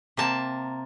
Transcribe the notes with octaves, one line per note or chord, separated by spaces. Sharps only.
C3 A#3 A5